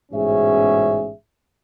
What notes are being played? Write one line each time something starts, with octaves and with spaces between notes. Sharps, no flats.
A1 G#2 B2 C#4 G#4 E5